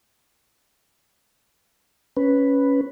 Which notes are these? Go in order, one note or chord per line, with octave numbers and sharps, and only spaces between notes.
C#4 B4